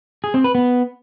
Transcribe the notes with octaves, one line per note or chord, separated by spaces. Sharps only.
G#4
C4
B4
B3